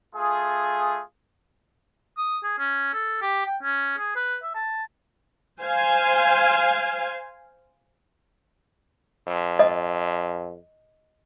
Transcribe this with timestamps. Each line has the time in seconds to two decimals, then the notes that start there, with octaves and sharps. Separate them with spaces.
0.15 A3 F4 G#4
2.18 D#6
2.44 G#4
2.59 C#4
2.94 A4
3.22 G4
3.46 G5
3.62 C#4
3.98 G#4
4.16 B4
4.43 E5
4.55 A5
5.61 C5 F5 G#5
9.27 F2
9.59 D#5